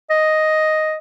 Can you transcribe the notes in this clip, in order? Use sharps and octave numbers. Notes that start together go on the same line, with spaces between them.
D#5